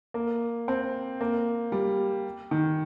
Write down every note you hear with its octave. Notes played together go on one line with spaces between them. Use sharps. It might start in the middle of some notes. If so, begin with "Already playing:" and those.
A#3
C4
A#3
G3
D#3